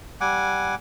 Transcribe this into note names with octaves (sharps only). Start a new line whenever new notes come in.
G3 F#5 G#5 D6